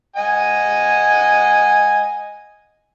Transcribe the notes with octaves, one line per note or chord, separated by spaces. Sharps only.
D#5 F#5 G#5